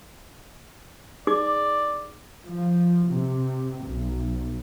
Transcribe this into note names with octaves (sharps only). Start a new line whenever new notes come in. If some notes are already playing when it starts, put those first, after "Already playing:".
D#4 G#4 D5 D6
F3
C3
B1